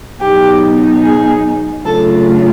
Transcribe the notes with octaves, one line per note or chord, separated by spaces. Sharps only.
B2 F#3 B3 D#4 G4
G#4
C#3 F#3 A3 D4 F4 A4